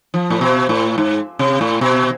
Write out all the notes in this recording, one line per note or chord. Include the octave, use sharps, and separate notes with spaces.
F3
A2
B2
A2
G#2
C3
A2
B2